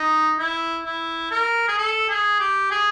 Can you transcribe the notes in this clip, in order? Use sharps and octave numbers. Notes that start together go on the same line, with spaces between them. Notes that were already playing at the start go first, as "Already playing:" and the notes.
Already playing: D#4
E4
E4
A#4
G#4
A4
G#4
G4
G#4